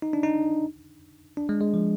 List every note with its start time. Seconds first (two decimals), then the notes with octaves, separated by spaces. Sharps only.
0.02 D#4
0.13 D4
0.23 D#4
1.37 D4
1.49 G#3
1.61 G#3
1.74 F3